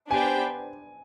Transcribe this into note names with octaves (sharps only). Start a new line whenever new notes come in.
B3 D4 G4 C5 G5 G#5